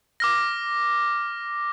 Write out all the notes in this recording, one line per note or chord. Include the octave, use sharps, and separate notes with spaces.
D6 F6 A#6